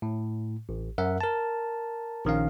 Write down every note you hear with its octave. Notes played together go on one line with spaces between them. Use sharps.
A2
A1
F#2 A#4 E5 F#5
A#4 A5
A#1 D#3 C#4 F5